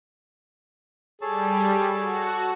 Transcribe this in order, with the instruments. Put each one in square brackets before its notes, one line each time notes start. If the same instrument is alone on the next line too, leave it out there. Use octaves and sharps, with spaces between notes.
[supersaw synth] G3 [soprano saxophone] G#4 [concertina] A4 C#5 A5
[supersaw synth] F#4